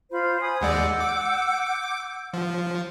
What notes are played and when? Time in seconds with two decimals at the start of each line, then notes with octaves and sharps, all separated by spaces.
0.11 F4 C5 B5
0.40 G#5 B5 D#6
0.61 D#2 G#3 D5 F#5 E6 G6
1.00 D6
2.33 F3